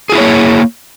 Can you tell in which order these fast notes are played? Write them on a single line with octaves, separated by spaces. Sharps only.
G#4 F4 E4 C#5 A#3